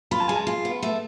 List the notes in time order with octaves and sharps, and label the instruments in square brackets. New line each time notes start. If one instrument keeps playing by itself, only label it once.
[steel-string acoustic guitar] F4 [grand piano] B5
[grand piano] A5
[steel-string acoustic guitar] G#3 [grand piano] G#5
[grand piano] A5
[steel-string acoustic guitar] F4
B3
A3